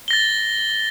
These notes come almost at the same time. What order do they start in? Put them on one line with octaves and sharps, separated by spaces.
G7 A#6 A6